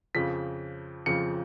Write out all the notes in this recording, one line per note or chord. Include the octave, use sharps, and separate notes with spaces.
F2 C#3 F3 B6
F2 C#3 F3 C#7